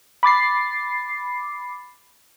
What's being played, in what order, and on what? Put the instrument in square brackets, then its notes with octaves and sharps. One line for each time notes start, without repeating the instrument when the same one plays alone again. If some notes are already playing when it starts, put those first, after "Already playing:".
[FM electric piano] B5 D6 A6 C7